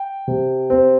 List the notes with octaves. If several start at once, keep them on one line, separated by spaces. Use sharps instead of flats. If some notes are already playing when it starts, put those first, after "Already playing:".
Already playing: G5
C3
C4